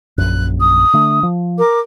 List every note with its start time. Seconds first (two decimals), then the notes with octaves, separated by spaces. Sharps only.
0.18 A#1 F#2 F#6
0.60 D#6
0.93 D3 A3 D4
1.23 F3
1.58 A#4 D6